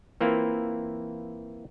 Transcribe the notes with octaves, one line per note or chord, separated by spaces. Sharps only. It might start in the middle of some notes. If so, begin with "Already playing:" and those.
E3 A#3 C4 E4 F4